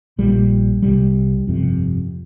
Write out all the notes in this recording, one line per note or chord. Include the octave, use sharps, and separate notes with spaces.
A#1 A#2 G3
C2 C3 G3
G1 F2 C3